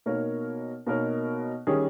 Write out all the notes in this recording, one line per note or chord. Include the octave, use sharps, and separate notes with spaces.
B2 A#3 D#4 A#4 C#5
B2 A#3 D#4 A#4 C#5
D#3 G3 C#4 G#4